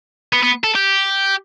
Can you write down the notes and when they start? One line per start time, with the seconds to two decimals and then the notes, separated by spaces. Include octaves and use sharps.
0.33 B3
0.43 B3
0.64 A4
0.75 G4